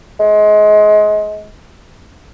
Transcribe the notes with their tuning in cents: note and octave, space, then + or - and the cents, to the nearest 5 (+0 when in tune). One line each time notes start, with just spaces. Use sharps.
G#3 +25